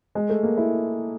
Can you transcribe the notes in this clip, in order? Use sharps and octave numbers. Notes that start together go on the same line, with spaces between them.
G#3
A3
A#3
E4